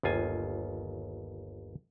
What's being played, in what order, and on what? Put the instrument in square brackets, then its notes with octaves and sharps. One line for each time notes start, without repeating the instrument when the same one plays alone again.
[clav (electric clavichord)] G1 D#2 F4 G#5